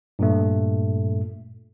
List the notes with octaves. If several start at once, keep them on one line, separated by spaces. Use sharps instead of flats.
G2 A#2 A3